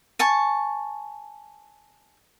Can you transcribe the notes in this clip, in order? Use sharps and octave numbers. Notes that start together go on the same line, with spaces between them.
G#5 A5 C#6